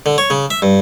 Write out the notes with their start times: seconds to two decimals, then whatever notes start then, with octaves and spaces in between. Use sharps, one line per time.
0.06 D3
0.18 C#5
0.30 C#3
0.51 E5
0.62 G2